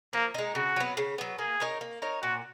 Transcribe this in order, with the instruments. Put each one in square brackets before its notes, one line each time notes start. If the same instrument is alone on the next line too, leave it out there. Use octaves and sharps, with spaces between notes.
[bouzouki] F3 [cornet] A#3
[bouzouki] G#3 D#4
[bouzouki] C#3 [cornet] F#4
[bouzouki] F#3 B3
C#3
F#3 B3
[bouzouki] A#3 [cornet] G#4
[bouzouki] D#4 A#4 C#5
A#3
D#4 A#4 C#5
[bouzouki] A#2 [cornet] F#4